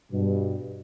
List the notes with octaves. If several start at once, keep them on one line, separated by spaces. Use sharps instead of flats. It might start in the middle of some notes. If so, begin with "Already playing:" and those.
G2 B2